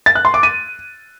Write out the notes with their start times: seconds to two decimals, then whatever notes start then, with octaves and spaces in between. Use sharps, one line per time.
0.06 A6
0.15 F#6
0.25 C6
0.34 D6
0.43 D#7